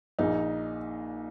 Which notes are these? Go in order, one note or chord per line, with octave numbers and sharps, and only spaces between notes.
A#1 A#2 D#4